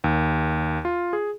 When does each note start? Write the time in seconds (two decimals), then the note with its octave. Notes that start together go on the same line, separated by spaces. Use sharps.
0.04 D#2
0.85 F4
1.13 G#4